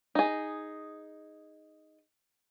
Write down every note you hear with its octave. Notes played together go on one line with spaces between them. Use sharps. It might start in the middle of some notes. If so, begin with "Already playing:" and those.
D#4 G#4